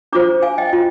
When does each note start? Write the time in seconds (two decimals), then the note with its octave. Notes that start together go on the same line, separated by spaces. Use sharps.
0.12 D4 F4 C5 A#5 D6
0.42 F5 G#5
0.58 D#5 G5
0.73 F4